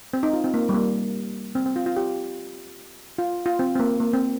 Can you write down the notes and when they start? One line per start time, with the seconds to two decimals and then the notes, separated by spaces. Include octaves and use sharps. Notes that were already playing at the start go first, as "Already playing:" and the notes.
0.13 C4
0.23 D#4
0.33 F4
0.44 C4
0.54 A#3
0.69 G3
0.74 A#3
1.55 C4
1.66 C4
1.76 F4
1.86 F4
1.96 G4
3.18 F4
3.46 F4
3.59 C4
3.75 C4
3.79 A#3
4.00 A#3
4.13 C4